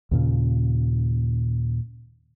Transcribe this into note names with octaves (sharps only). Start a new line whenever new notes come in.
D#2 A#2 C#3